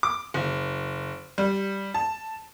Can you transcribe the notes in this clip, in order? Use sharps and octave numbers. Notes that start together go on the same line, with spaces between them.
D6
F#1
G3
A5